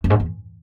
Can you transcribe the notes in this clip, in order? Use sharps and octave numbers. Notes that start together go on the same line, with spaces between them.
F#2
G#2
E2